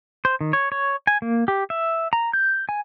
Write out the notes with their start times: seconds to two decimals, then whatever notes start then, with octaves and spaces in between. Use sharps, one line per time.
0.25 C5
0.41 D#3
0.53 C#5
0.72 C#5
1.07 G#5
1.22 A#3
1.48 G4
1.70 E5
2.13 A#5
2.33 G6
2.69 G#5